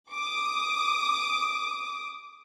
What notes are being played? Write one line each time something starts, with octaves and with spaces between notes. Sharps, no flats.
D6 D#6